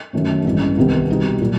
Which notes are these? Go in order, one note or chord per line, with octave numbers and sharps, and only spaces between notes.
F#2 D#3 F#3 A3 C#4
A1 G2 E3 G#3 C#4
C2 C3 D#3 G3 B3
B2 G3 C4 D#4
A#2 F#3